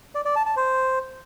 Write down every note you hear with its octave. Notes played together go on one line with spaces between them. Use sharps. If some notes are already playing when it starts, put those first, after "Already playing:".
D5
D5
A5
A5
C5